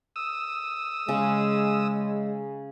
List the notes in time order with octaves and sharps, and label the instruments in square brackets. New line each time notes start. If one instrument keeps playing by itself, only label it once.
[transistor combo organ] D#6 E6
[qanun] C#3 [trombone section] G#3